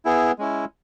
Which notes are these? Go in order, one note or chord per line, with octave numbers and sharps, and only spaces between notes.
B3 E4 G#4
G#3 C#4 E4